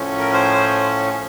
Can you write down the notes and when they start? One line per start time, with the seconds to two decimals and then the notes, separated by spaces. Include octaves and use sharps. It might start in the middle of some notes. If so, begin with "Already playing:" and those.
Already playing: A2 F3 A3 C#4
0.18 A#4
0.33 C5